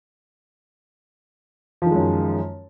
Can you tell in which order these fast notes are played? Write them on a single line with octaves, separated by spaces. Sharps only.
F3 D#3 G#3 F#2